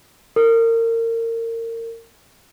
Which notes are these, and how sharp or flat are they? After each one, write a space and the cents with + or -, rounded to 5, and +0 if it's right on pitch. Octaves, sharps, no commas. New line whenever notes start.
A#4 -30